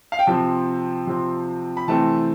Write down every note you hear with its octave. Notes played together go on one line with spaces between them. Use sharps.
F5
G5
C3 F3 C4 A5
C3 F3 C4
B5
C3 E3 A3 C4 A5